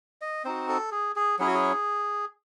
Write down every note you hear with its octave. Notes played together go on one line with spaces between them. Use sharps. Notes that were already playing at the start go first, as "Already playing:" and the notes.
D#5
C4 D#4 F#4 C5
A4
G#4
G#4
F#3 C#4 E4 G#4
F#4
G#4